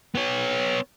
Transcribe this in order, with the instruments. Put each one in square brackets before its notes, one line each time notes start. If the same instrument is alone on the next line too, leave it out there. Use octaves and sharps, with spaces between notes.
[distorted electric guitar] B3 C#5